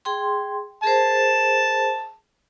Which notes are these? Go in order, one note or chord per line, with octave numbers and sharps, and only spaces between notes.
G#4 G5 C6
G#4 A#4 C5 A5